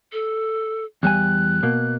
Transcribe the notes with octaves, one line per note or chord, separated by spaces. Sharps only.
A4
E2 G3 G#5 F#6
B2 A#3